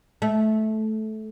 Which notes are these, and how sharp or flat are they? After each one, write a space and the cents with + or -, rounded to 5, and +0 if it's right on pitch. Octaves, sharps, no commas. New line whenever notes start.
A3 -15